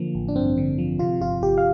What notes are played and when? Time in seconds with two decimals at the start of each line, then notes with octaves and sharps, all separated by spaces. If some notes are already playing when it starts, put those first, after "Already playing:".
Already playing: D3 F3 A#3
0.15 A1
0.28 D4
0.36 G2 C4
0.57 D3
0.78 F3
0.99 C3 F4
1.21 G1 F4
1.42 G1 G4
1.58 F5